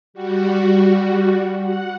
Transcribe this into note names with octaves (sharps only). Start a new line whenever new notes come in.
G3 F#4
F#5 F#6